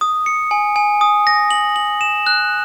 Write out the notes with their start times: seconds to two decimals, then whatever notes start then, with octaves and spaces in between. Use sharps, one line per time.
0.01 D#6
0.26 C#7
0.51 G#5
0.76 G#5
1.01 D#6
1.27 A#6
1.51 F#7
1.76 F#7
2.01 E7
2.27 F#6